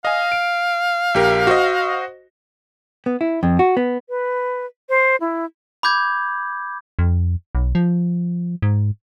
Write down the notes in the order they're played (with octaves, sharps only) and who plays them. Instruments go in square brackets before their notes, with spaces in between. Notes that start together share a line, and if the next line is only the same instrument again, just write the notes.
[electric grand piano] D#5 G#5 [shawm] F5
[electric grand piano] D7
A#1 G4 A#4
F#4 C5 D#5
[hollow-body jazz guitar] B3
E4
F2
F#4
B3
[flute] B4
C5
E4
[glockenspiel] B5 D6 G6 G#6
[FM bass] F2
B1
F3
G#2